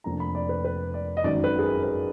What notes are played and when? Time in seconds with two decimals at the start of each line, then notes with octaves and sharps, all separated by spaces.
0.04 F1 F2 F3 A#3 D4 A#5
0.20 B5
0.35 D5
0.49 B4
0.64 B4
0.94 D5
1.17 D#5
1.24 G#1 F#2 D#3 F#3 D5
1.44 B4
1.59 G#4
1.63 A#4
1.83 B4